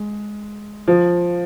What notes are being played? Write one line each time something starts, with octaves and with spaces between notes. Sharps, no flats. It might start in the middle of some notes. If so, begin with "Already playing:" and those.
Already playing: G#3
F3